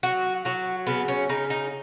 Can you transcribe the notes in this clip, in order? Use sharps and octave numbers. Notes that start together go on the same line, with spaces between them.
F#3 F#4
F#3 F#4
C#3 B3
C#4
C#3 D#4
D#4